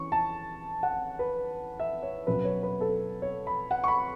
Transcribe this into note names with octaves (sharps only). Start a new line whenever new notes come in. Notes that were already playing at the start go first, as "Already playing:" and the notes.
Already playing: E3 C#4 C#6
A5
F#5
B4
E5
C#5
B2 F#3 C#4 B4
C#5
B4
A4
C#5
B5
F#5
C#6
B5